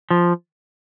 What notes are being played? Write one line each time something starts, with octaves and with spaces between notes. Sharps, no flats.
F3